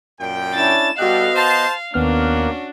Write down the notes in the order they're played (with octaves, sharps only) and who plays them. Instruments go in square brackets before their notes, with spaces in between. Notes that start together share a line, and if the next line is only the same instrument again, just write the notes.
[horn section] F#2 A#2 G5
[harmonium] C#4 D4 E4 [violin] A6 E7
[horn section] G3 G4 A4 [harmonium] B3 D#5 [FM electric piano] F#4 F#6 [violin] F5
[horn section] C5 A5
[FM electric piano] D#2 B3 F6 [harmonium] A#3 [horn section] C#4 F#4 [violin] D4